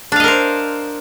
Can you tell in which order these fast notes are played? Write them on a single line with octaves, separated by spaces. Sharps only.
D4 F5 D#5 A#4 C5